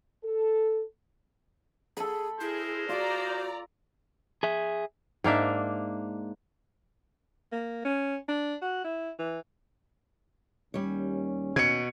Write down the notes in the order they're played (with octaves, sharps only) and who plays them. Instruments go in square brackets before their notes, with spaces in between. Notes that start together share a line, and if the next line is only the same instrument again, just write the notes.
[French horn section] A4
[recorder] G#4 [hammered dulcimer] A4 B5
[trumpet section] G#3 A#4 C5 [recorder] E4 [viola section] G#4
[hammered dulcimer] F4 [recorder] F#4 [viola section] D5 A#5
[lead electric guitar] G#4 E5
[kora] G#2 A#3 D4 E5
[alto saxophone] A#3
C#4
D4
F#4
E4
E3
[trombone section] D#2 C#4 [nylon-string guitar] G3 C#5
[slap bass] B2 [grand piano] G#6 C#7